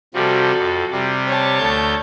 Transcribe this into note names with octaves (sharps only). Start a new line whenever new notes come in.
C3 F3 G3 F#4 A4
F2
C3 G3
C#5 A5
D2 A3 G6